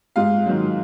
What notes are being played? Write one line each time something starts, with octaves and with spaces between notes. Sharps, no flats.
G#2 F4 F5
D#3 F#3